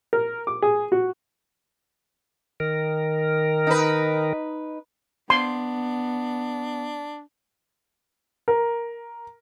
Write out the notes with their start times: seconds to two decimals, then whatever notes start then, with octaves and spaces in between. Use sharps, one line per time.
0.13 A#4
0.47 D6
0.62 G#4
0.92 F#4
2.60 D#3 A#4
3.67 D#4 B4
5.30 B3 D4 C6
8.48 A#4